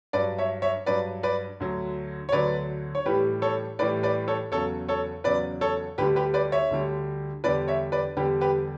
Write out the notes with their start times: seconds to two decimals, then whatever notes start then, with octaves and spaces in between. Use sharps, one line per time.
0.13 G2 B4 D5
0.17 F#3
0.38 C#5 E5
0.62 C#5 E5
0.86 G2 F#3 B4 D5
1.23 B4 D5
1.60 D2 D3 F#3
2.29 C#5
2.32 D2 D3 F#3 B4 D5
2.95 C#5
3.06 A2 E3 G3 G4 B4
3.42 A4 C#5
3.79 A2 E3 G3 B4 D5
4.03 B4 D5
4.28 A4 C#5
4.51 E2 C#3 F#3 A4 C#5
4.88 A4 C#5
5.24 E2 C#3 F#3 B4 D5
5.61 A4 C#5
5.98 D2 D3 G3 G4 B4
6.16 G4 B4
6.34 B4 D5
6.52 C#5 E5
6.70 D2 D3 G3
7.44 E2 D3 G3 B4 D5
7.68 C#5 E5
7.92 B4 D5
8.17 E2 D3 G3 G4 B4
8.41 G4 B4